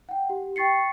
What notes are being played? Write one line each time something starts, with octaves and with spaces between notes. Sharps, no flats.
F#5 G5
G4
G5 C#6 A6 C7 C#7